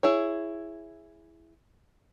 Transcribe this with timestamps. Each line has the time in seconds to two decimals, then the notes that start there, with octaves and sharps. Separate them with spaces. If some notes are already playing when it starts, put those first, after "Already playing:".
0.03 E4 G#4 C#5